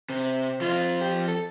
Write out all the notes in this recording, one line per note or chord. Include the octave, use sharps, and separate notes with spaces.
C3 C5
F3 C4 F4
G4
A4